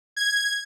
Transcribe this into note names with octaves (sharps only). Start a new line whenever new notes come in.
G#6